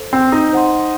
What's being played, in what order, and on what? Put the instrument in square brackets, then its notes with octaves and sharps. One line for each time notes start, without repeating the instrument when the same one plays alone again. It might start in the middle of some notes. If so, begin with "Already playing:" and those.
Already playing: [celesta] A4 C5
[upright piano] C4
D#4
[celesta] C5 F#5 C6